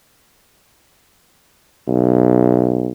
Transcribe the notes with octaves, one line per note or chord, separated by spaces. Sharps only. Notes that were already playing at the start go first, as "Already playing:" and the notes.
B1